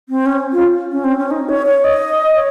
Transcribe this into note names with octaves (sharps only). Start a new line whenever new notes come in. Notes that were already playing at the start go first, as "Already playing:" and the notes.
C4
C#4
F4
C#4
C4
C#4
D#4
C#5
C#5
D#5
C#5